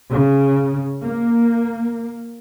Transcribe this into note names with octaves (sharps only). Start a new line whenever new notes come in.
C#3
A#3